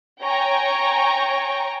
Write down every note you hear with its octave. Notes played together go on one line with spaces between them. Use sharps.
C#5 G5 G#5 A#5 C#6